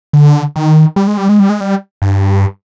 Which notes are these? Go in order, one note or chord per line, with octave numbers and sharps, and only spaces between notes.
D3
D#3
G3
G#3
G3
G#3
G3
G#3
G3
G2